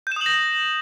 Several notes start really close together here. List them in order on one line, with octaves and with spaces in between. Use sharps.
G6 E7 D#6 F#7 A#6